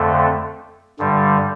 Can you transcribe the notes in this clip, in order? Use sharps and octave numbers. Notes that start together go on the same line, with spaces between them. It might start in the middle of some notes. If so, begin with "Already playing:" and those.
Already playing: F2 D3 A3
G2 D3 G3